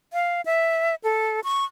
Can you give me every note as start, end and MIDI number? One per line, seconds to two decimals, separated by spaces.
0.13 0.41 77
0.46 0.95 76
1.04 1.40 69
1.44 1.65 85